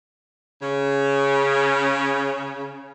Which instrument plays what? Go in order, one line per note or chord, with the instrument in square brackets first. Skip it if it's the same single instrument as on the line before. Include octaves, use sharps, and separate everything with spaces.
[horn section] C#3 C#4